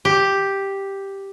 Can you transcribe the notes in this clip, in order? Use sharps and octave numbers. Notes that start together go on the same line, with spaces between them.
G4